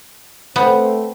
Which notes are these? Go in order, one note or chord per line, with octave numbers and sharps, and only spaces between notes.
A3 B3 C4